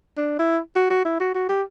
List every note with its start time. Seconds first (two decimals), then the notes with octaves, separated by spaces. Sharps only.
0.17 D4
0.39 E4
0.76 F#4
0.90 F#4
1.05 E4
1.20 F#4
1.35 F#4
1.49 G4